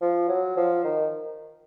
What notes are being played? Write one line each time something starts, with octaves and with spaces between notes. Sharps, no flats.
F3
F#3
F3
D#3